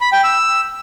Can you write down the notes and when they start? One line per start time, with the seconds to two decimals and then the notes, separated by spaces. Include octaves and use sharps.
0.01 B5
0.12 G5
0.24 E6